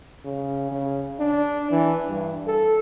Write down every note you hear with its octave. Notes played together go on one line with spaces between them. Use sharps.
C#3
C#3
D4
E3
G2
A4